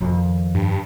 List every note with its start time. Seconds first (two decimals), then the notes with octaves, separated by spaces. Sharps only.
0.01 F2 D#3
0.55 G2